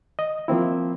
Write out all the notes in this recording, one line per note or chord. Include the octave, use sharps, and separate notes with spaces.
D#5
F3 A#3 C4 E4